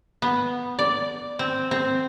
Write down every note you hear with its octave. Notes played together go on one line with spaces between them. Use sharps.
B3
D5
C4
C4